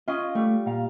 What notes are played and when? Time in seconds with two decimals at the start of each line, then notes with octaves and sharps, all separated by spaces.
0.08 C#4 F4 D#5
0.35 G3 A3
0.66 A#2 F5